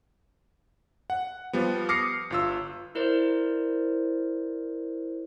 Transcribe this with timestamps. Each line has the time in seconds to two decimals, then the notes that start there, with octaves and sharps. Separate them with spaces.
1.10 F#5
1.53 F3 G3 B3
1.89 D6 D#6 F6 A#6 C7 C#7
2.30 G1 F4 E6
2.95 E4 A#4 C5 D5